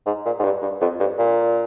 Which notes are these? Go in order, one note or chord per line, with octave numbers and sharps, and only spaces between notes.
G#2
A#2
G#2
G2
G2
F2
G2
A#2